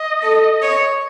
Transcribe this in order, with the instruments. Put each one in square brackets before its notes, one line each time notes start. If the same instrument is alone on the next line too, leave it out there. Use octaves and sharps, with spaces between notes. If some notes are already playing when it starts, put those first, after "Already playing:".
Already playing: [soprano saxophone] D#5
[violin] A4
C#5